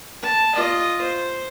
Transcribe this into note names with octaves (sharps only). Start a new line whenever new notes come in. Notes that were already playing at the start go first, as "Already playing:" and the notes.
A5
F4 D#5
C5